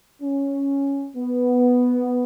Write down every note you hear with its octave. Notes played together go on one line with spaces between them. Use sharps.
C#4
B3